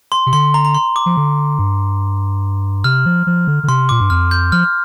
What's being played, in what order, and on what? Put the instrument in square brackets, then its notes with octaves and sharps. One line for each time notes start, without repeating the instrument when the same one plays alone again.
[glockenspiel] C6
[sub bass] C3
[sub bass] D3 [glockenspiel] C6
[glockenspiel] A#5
A#5
C6
D6
[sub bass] F3
D3
G2
[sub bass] C3 [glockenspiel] F6
[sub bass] F3
F3
D3
D3
[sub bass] C3 [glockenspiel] C6
[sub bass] A#2 [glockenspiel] D6
[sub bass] G2
[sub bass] F2 [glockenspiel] F6
[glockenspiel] G6
[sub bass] F3 [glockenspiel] F6